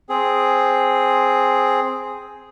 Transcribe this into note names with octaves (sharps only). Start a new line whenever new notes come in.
C4 G#4